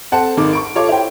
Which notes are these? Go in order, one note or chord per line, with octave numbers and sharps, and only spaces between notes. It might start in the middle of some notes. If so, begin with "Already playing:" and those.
C4 A4 C5 F#5 A5
G#1 D#3 D#4 D6
C#6 D7
F4 A4 C#5 D6
E4 C5 G5